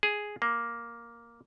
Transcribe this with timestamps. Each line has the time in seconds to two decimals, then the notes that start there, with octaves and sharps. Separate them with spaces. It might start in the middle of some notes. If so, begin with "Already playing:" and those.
0.03 G#4
0.42 A#3